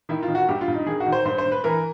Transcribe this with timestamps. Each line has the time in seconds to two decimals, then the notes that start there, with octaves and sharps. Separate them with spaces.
0.09 D#3 E4
0.23 F4
0.28 D#3
0.35 F#4
0.49 G2 G4
0.61 F4
0.68 G2
0.74 D#4
0.86 D#3 G#4
1.00 F#4
1.06 D#3
1.12 C5
1.25 G2 C5
1.38 C5
1.45 G2
1.52 B4
1.64 E3 A#4